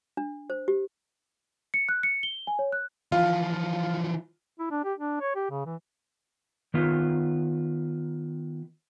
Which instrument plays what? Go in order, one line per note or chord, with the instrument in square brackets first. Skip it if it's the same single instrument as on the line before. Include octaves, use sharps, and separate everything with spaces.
[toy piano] D4
C5
G4
[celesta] C#7
F#6
C#7
G7
G#5
C#5
F#6
[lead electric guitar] E3 F3 [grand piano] F4
[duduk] E4
D4
G4
D4
C#5
G4
C#3
E3
[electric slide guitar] D#3 B3 F4